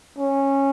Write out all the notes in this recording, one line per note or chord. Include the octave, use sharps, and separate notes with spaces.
C#4